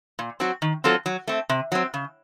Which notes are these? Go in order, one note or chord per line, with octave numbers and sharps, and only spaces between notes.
A#2
F#3 C4 F#4
D#3
F#3 C4 F4 A4
F#3
A3 C4
C3
F#3 C4
C#3